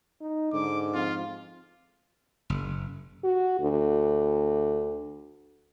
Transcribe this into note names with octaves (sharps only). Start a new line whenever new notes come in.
D#4
G#2 D3 D6
F2 F4
F#1
F#4
D2